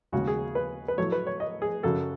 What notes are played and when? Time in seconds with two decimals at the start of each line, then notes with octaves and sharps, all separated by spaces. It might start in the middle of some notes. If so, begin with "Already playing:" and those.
0.12 D#2 C#3 G#3 C#4 F#4
0.27 G#4
0.55 B4
0.88 B4
0.98 A2 F#3 A3 C#5
1.12 B4
1.27 C#5
1.40 D#5
1.62 G#4
1.83 F#2 C#3 F#3 A4